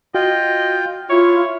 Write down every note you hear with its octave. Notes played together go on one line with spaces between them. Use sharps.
F4 F#4 D#5 G5
E4 F4 C#5